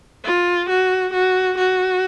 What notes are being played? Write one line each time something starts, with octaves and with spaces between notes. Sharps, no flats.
F4
F#4
F#4
F#4